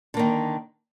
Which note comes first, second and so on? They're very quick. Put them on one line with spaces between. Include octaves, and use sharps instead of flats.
D3 A#3 D#3